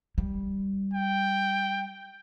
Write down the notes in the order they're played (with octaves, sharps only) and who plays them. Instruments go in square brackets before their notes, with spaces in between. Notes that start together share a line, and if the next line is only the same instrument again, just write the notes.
[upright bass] G3
[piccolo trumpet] G5